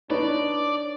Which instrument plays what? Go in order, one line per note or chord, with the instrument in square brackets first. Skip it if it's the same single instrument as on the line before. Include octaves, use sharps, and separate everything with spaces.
[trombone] D4 [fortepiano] D#4 B4 [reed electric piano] C#5 [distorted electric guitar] D5